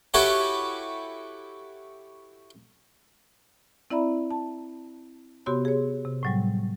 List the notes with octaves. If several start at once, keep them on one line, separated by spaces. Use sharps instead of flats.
E4 F#4 G4 A4 B4 C#5
C4 E4 D5 E5 A#5 B5
A5
C3 B3 F#4 G4 C#5 C6
G#4 C#5
C3
A2 F#3 G3